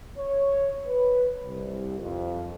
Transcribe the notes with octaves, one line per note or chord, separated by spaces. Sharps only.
C#5
B4
C2
F2